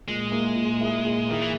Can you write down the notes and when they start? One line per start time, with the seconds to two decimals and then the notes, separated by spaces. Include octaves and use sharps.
0.08 A#2 G#3
0.32 A#3 E4 G#4
0.55 A#2
0.80 A#3 E4 G#4
1.04 A#2
1.28 D#3 A#3 E4 G#4
1.42 E3